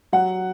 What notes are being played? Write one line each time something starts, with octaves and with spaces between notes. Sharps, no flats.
F#3 F#5